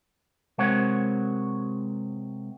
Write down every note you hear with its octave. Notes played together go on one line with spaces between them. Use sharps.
C3 G#3 A#4 C5 C#5 F#5